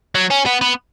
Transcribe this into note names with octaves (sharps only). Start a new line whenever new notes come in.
F#3
C#4
B3
B3